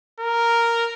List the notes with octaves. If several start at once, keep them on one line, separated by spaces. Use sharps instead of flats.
A#4